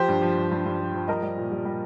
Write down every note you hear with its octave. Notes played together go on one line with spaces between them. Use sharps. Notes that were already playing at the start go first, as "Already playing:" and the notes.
Already playing: F3 G4 C5
G2
F3
G2
G2
G2
F3
F3
G3 A#4 D#5
G3
A#2
G3
G3